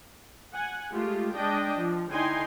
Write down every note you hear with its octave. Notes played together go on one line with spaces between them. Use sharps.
F#5 G#5
G#3 A3 F4 G4
G#3 D4 D#5 G5
F3
D3 D#4 E4 G5 G#5 C6